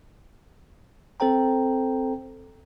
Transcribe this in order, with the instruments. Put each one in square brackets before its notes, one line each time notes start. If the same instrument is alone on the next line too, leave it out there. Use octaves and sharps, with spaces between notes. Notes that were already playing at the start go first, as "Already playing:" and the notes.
[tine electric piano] C4 A4 C5 G5 A#5